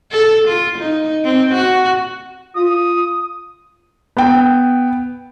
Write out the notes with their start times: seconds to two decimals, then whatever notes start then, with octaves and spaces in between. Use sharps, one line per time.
0.11 A4
0.48 F4
0.78 D#4
1.24 C4
1.53 F#4
2.56 F4 D#6
4.17 B3 G5